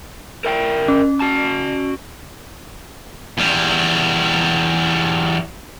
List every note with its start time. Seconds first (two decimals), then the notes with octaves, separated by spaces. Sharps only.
0.45 A#4 E5 G5
0.88 C#4
1.20 F#4 A5
3.38 E2 G3